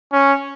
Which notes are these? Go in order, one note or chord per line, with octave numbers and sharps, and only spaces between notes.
C#4